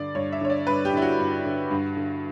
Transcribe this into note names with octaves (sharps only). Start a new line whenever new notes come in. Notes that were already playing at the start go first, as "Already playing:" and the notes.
Already playing: G2 D3 D5
G2 C#5
E5
D3 C#5
D5
G2 B4
G4
D3 E4
F#4
G2
D3
G2
D3